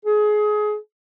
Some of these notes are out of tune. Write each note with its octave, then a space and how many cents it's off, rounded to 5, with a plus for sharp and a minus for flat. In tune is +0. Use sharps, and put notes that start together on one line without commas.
G#4 +25